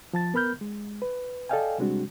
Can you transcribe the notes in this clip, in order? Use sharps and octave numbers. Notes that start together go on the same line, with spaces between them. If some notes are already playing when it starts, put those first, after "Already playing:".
F3 A5 A6
B3 A#4 B5 F6 G6
G#3
B4
A4 D5 D#5 F5 G5 G#5
C3 G3 G#3 C4 D4 F#4